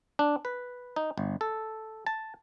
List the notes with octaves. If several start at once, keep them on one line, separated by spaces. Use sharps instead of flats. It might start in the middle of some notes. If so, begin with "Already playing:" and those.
D4
B4
D#4
G1
A4
A5